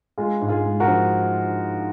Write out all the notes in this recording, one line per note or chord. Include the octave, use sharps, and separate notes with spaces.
G#3 F4 G#4
G#2
F4 G#4
G#3
F#4 A#4
F3